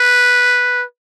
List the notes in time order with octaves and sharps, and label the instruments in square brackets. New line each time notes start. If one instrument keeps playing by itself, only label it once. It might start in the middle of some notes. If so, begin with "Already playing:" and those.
Already playing: [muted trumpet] B4